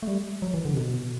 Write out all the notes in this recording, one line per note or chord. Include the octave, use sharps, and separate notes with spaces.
A3
G3
F#3
E3
D3
C3
B2